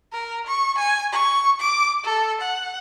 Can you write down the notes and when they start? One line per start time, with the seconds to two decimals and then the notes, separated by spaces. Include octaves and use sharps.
0.13 A#4
0.47 C#6
0.78 G#5
1.12 C#6
1.60 D6
2.05 A4
2.41 F#5